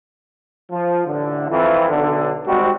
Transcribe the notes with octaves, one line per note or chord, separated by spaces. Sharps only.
F3
A1 D3
F2 E3
B1 D3
G#1 G3 G#3 C4 F#4